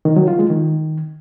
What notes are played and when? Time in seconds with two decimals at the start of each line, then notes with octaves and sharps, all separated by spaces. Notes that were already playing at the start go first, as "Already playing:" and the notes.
0.05 D#3
0.16 F#3
0.28 F4
0.39 G#3
0.50 D#3